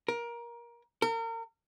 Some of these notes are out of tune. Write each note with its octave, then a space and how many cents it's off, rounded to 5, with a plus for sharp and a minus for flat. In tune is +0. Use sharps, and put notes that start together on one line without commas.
A#4 +20
A#4 -35